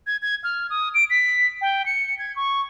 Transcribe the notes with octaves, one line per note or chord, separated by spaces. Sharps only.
G#6
G#6
F6
D#6
D7
B6
G5
C#7
G#6
C#6